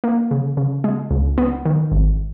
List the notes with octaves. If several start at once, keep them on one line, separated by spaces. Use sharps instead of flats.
A#3
C#3
C#3
G#3
C#2
B3
D#3
G#1